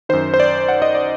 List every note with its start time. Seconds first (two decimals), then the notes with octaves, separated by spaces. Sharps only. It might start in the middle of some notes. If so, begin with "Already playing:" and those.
0.09 F#2 D#3 C5
0.34 C5
0.40 D5
0.69 F#5
0.82 D#5
0.95 D5